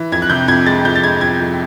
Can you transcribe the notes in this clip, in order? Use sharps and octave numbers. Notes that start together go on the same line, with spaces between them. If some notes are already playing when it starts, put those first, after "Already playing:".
Already playing: E3
F2 G#6
F#6
C3 G6
F2 G#6
G#3 A6
F2 G6
A6
G#3 G#6
F2 G#6
F2